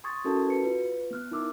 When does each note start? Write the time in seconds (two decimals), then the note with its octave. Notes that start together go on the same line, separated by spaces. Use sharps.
0.04 C6 C#6 D#6 G#6 A6
0.25 C#4 E4 F#4 A4 A#4 A5
0.47 F#4 B4 C#7
0.63 F4 B4
1.11 B3 F6 F#6
1.31 D#4 E4 A#4 D6 E6